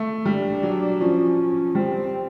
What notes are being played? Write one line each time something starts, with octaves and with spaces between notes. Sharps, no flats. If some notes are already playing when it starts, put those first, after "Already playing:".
Already playing: A3
G3 D4
F#3
F3 C#4
G3 C4